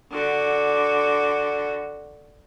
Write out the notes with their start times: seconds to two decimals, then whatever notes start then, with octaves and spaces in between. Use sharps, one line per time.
0.12 D3 F#4